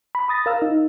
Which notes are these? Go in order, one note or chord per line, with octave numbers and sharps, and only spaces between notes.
B5
B5 D#6 A6 A#6
A#4 F5 E6 F6
D#4